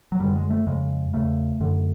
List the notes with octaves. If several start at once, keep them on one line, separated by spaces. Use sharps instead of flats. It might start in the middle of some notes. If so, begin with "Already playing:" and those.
F#3
F#2 D3 G3
G#3
A3
F2 C#3 G#3
E2 C#3 A3
F#2 D3